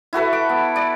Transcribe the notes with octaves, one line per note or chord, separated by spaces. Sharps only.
E4 F#4 A4 B4
D6
B3
D5